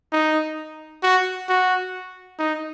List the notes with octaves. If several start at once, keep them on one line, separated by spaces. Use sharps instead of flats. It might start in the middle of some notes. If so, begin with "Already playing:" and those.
D#4
F#4
F#4
D#4